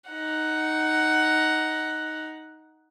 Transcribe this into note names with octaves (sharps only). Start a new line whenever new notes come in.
D#4 F#5